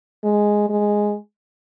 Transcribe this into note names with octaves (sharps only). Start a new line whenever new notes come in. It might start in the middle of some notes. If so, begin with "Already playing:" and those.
G#3
G#3